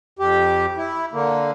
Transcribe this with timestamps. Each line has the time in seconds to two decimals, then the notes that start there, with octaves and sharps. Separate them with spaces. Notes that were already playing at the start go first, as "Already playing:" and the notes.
0.19 F2 G4
0.77 E4
1.13 D3 A#3